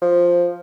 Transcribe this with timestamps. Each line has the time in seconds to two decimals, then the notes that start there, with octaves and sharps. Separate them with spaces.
0.02 F3